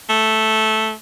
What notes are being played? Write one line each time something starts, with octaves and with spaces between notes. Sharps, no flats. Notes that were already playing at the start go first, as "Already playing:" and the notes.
A3